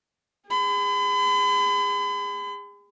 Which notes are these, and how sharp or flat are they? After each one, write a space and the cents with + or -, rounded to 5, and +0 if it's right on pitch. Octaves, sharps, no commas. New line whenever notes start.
G#4 -35 B5 +40